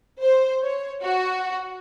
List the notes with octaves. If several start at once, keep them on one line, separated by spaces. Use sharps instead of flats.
C5
C#5
F#4